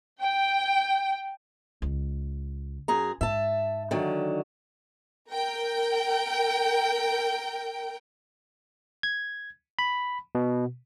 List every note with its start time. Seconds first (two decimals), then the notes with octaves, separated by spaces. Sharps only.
0.21 G5
1.82 C#2
2.88 F#2 G#4 A#5
3.21 G#2 E5 A5
3.91 D3 D#3 F#3
5.30 A#4 G5
9.03 G#6
9.79 B5
10.35 B2